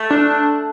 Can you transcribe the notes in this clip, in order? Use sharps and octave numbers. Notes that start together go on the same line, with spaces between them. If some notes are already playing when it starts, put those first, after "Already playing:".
Already playing: A3
D4